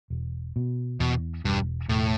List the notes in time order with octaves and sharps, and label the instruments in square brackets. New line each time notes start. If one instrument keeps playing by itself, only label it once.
[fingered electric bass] E1
B2
[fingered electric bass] E2 [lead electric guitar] B2
[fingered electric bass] E1 [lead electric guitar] G2
[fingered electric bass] E1 [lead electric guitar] A2